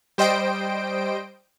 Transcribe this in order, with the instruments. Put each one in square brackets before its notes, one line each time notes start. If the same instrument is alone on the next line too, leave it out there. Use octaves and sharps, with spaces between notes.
[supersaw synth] G3 C5 D#5 G5 D7